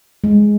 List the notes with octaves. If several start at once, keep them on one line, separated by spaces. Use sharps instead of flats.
G#3